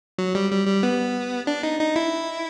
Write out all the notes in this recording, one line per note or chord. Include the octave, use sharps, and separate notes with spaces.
F#3
G3
G3
G3
B3
D4
D#4
D#4
E4